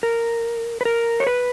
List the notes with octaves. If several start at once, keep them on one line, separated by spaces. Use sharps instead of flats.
A#4
B4
A#4
C#5
B4